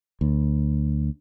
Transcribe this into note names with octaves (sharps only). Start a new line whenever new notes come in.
D2